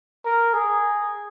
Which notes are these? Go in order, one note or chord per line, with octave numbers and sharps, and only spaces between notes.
A#4
G#4